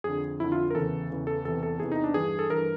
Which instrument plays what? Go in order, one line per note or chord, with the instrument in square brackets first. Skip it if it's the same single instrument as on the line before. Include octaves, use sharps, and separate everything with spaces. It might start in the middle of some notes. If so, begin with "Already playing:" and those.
[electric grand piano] F2 D3 G#4
F2 D3 E4
F4
A#4
E2 C#3 E3 A4
E2 C#3 E3
A4
E2 C3 E3 A4
A4
E2 C3 E3 G#4
D#4
D4
G2 E3 G#4
A4
G2 E3 A#4